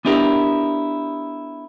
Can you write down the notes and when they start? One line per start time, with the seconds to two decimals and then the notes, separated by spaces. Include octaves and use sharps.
0.05 B3 D4 E4 G4 A#4